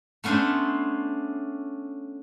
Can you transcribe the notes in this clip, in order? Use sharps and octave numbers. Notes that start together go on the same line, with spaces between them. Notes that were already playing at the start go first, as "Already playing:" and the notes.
A3 B3 C#4 D4 C5